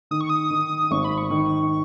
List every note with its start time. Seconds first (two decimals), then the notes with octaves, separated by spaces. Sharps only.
0.11 D#3 D#6
0.21 C#6
0.30 D#6
0.51 D#3
0.91 G#1 C#6
1.04 B5
1.18 C#6
1.30 D#3